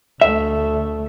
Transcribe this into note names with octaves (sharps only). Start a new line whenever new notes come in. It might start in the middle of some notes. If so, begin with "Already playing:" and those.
D2 A3 E5